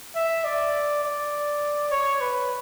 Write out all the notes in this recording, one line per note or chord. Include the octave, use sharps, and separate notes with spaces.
E5
D5
D5
C#5
B4